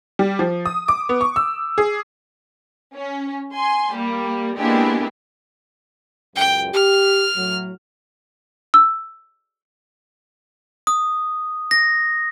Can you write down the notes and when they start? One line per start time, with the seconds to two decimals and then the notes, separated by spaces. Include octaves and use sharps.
0.19 G3
0.39 F3
0.66 D#6
0.88 D6
1.09 B3
1.21 C#6
1.36 E6
1.78 G#4
2.95 C#4
3.55 G#5 C6
3.95 G3 A#3
4.58 G#3 A#3 B3 D4 E4 G4
6.36 C#2 F#2 G5
6.73 G4 F6
7.36 A2 F#3
8.74 E6
10.87 D#6
11.71 A#6